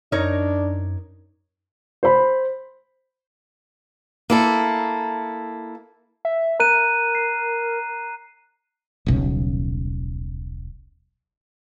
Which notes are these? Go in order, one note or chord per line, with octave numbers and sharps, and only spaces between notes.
F#2 D4 D#4 A#4 C#5
C5 B5
A#3 E4 A4
E5
A#4 A#5 F#6 D#7
C7
D#1 B1 C#3